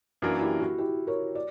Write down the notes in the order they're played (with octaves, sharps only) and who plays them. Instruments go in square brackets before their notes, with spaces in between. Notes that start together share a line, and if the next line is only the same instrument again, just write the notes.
[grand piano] F#2 E3 A#3 D4 A#4 [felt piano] F#4
[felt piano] E4 G4
F#4
E4 G4
A#4 C#5
D5